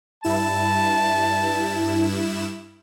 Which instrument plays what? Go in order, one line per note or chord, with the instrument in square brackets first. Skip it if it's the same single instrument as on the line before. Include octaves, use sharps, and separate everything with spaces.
[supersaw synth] G2 E4 E7 [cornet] A5